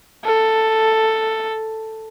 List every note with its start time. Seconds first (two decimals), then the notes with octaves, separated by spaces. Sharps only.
0.25 A4